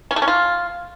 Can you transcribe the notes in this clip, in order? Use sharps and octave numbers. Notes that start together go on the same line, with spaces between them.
C#4
A3
C#4
F4